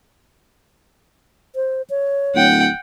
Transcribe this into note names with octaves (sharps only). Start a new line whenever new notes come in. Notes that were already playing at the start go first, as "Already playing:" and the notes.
C5
C#5
D1 F#5 G5